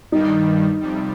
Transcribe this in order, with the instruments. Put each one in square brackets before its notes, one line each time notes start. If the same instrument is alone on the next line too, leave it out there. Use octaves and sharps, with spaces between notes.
[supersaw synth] G2 D#3 G3 [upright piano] D#4
[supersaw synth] F2 C3 G3